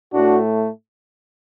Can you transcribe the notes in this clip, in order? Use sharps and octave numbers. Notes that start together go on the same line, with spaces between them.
A2 A3 D4 F#4